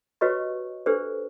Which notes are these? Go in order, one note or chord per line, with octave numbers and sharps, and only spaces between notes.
F#4 G4 B4 C#5 D#5 C#6
D4 G4 A4 B4 C5